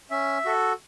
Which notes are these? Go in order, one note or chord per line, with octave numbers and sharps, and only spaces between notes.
C#4 E5
F#4 A4